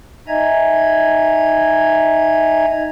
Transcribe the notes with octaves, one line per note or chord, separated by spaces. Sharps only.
D#4 D#5 E5 G#5 A#5 G#6